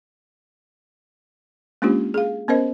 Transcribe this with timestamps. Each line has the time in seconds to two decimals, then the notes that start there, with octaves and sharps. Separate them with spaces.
1.82 G#3 A#3 C#4 D4 F4 G4
2.14 G#4 F5
2.48 B3 C#4 A#4 C5 D#5